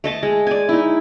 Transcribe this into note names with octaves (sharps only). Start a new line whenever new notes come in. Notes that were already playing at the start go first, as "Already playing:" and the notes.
A3 D#5 A5
G#3
D5 G#5
D#4 E4